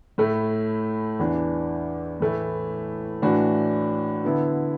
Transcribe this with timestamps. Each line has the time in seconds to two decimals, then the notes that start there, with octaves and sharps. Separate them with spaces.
0.18 A2 A3 E4
1.19 E2 E3 D4
2.20 A2 E3 A3 E4
3.22 A2 E3 D4 F#4
4.24 D3 B3 E4